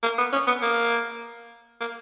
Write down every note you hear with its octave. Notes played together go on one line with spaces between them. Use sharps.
A#3
B3
C#4
B3
A#3
A#3